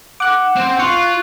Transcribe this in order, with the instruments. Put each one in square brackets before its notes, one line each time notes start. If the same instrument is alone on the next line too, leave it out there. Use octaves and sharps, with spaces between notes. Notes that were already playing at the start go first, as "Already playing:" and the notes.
[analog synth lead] F#5 [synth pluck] D6 F#6
[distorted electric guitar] C4 C5
[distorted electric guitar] F4 [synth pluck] C#6 [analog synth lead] F#6